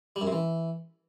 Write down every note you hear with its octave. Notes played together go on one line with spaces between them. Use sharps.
G3
F#2
C3
E3